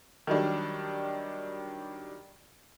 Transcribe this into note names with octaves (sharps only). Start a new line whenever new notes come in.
D#3 F#3 G3 D4